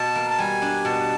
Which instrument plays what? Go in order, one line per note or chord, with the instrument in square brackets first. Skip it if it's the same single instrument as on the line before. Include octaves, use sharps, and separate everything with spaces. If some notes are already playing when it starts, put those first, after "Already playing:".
Already playing: [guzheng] B2 [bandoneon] A5
[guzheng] A#3
[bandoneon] A5
[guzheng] G3 [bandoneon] G#5
[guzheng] D4
[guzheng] B2 [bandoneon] A5